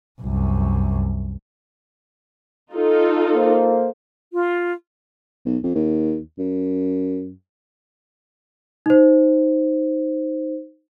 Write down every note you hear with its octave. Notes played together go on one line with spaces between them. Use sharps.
C2 F#2
D#4 F4 A4
A#3 C5
F4
B1
F2
D#2
F#2
D#4 C5